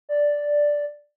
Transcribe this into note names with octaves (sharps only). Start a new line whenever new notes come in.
D5